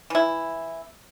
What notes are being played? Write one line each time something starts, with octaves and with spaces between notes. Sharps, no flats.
E3 E4